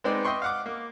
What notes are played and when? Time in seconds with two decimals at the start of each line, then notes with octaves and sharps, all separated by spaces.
0.04 G#3 B3 C4 D#4 D5
0.24 D#5 E5 G5 C6 C#6
0.42 F5 F#5 D6
0.66 A#3